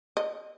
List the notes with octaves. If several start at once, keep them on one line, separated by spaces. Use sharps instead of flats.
D#5